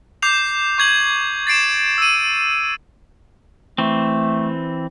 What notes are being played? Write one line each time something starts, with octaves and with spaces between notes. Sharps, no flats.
D6 G6 C7 F7
C#6 G#6 F#7
A6 C7 D7 E7
E6 D#7
E3 A3 C4